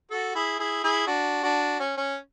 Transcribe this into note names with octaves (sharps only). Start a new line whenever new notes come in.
F#4 A4
E4 G#4
E4 G#4
E4 G#4
D4 F#4
D4 F#4
C#4
C#4